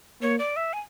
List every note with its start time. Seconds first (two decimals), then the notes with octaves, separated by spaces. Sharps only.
0.22 A#3 C#5
0.39 D5
0.56 E5
0.73 G#5